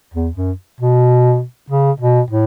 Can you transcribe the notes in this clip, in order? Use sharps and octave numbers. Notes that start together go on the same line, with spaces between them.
E2
F#2
B2
C#3
B2
A2